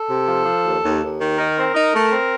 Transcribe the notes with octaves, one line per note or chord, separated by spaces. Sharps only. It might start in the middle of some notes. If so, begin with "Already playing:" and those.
Already playing: A4
C3
F3
F3
D#2
D#2
D#2
D#3
D#4 A#4
C4
D#4
A3
C4